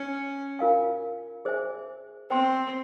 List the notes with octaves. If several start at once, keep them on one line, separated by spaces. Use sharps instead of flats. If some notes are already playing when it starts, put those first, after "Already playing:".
Already playing: C#4
F4 A#4 F5 G#5
G#4 C5 E5 G#5
C4 C5 G5 C6